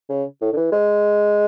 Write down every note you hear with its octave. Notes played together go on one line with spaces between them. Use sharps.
C#3
A2
D3
E3
G#3